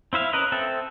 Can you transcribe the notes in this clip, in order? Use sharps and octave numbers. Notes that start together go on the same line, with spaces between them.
C4 E4 E5 F5
C#4 A#4 B4 D#5
C4 A4 E5